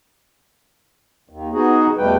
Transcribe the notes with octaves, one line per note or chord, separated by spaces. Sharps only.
D#2
B3 D#4 F#4 G#4
E2 B2 G3 A3 B4 G5